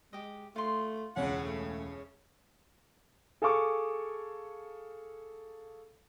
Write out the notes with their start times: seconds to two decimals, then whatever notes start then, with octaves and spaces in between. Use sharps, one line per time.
0.13 G#3 G4 D#5
0.56 A3 F4 C6
1.16 E1 C#2 A2 C#3 C#4 F#5
1.45 A3
3.42 G#4 A4 F5 C#6 D6